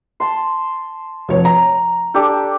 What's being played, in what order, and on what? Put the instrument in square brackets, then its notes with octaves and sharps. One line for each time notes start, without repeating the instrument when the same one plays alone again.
[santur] A5 C6
[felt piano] F1 C#5
A#5
[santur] D4 G4 A4